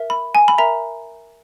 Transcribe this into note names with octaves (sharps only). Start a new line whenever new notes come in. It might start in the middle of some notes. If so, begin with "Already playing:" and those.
Already playing: A#4 E5
B5
G#5
B5
A#4 E5 A#5